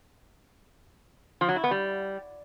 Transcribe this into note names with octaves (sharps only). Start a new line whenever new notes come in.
F3
F#3
E4
B3
G3